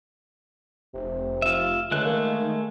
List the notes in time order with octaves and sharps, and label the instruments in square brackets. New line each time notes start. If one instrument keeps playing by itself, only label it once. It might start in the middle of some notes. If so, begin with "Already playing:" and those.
[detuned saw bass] F1 [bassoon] C3
[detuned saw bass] F1 [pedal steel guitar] F4 E5
[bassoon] C#2 [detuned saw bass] D3 [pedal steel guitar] G#3 A3 F#6
[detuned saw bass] D#3 [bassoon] A#3